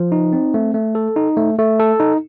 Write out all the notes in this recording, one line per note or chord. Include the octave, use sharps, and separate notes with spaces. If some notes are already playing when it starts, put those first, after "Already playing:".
Already playing: F3
D#4
C4
A3
A3
A4
D#4
A3
A3
A4
D#4